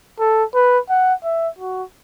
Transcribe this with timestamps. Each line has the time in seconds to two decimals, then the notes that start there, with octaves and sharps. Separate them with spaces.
0.20 A4
0.55 B4
0.89 F#5
1.24 E5
1.59 F#4